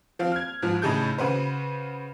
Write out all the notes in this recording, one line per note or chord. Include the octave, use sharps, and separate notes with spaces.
F3 C4 F5
F6 G#6
G#2 F3
A2 C#3 D#4 G#4 A4 G6
C#3 F#4 B4 C5